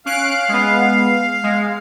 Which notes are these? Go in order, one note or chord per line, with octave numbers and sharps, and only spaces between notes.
C#4 F5 F#6 D7
G#3 B3
G#3